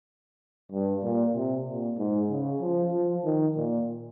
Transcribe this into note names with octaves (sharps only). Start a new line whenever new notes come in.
G2
A#2
C3
A#2
G#2
C#3
F3
F3
D#3
A#2